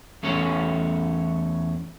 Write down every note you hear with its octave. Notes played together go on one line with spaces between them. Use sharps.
E2 A3 C#4 C#5